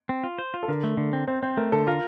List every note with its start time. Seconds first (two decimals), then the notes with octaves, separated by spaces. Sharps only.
0.09 C4
0.24 F4
0.38 C5
0.54 F4
0.63 A4
0.68 D3 A#4
0.84 A3
0.97 D3
1.13 C4
1.27 C4 C5
1.43 C4 C5
1.57 A3 A#4
1.72 D3 A4
1.87 F4 A#4